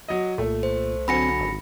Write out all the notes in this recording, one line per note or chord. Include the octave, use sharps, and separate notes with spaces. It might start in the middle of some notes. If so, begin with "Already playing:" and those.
F#3 D#5
C2 A#2 A3
C5
D3 F#3 C4 G#5 B5 A#6 C#7
G#1